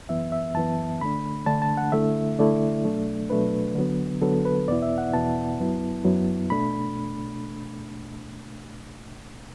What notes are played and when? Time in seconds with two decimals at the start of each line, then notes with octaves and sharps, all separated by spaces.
0.09 F#2 E3 B3 E5
0.32 E5
0.55 F#2 E3 B3 A5
1.01 D3 A3 D4 B5
1.46 D3 A3 D4 A5
1.62 A5
1.77 F#5
1.92 D3 A3 E4 E5
2.38 D3 A3 E4 D5
2.84 B2 F#3 A3 D4
3.30 B2 F#3 A3 D4 B4
3.75 D3 F#3 B3
4.22 D3 F#3 B3 A4
4.45 B4
4.68 E2 B2 B3 E4 D5
4.82 E5
4.98 F#5
5.13 E2 B2 B3 E4 A5
5.59 F#2 F#3 B3 E4
6.05 F#2 F#3 B3 E4
6.50 B2 A3 D4 B5